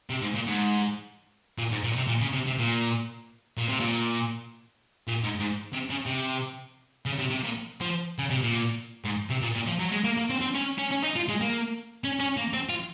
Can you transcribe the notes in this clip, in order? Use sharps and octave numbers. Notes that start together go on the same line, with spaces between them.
C3
G#2
A#2
G#2
A#2
G#2
A#2
C3
A#2
C#3
C3
C3
A#2
A#2
C3
A#2
A#2
G#2
G#2
C3
C#3
C3
C#3
C3
C3
A#2
F3
C#3
C3
A#2
G#2
C3
A#2
A#2
F3
F#3
G#3
A#3
A#3
C4
C4
C#4
C#4
C#4
D#4
F4
G#3
A#3
C#4
C#4
A#3
C4
F4